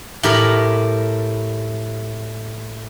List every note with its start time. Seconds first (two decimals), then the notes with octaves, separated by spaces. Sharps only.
0.23 A2 G4 A#4 B5